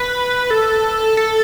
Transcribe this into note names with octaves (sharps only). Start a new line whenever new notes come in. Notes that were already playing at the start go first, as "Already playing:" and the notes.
Already playing: B4
A4
A4